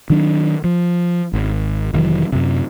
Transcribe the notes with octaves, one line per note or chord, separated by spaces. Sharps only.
D#3 F#3 D4
F3
G#1
F1 D#3 E3 F#3
F#2 C3